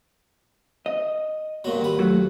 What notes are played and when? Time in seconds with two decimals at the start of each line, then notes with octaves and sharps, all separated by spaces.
0.86 D#5
1.64 G2 A#2 F#3
1.81 D#2 B4
1.99 F#3 A3 F#4